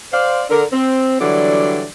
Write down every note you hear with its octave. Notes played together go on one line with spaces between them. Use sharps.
C5 D5 F5
D3 A#4
C4
D3 E3 F#3 G3 D4 D5